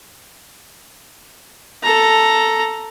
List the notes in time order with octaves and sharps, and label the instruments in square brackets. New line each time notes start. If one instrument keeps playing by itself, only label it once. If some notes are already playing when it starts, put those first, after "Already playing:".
[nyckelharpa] A4 A#5